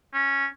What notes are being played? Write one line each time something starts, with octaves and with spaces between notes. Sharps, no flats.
C#4